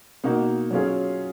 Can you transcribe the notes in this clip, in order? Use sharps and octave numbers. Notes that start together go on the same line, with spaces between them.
B2 A#3 D#4 F#4
F#3 C#4 F4 G#4